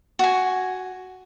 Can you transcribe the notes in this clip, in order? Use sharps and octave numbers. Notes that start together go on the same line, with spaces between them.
F#4 G#5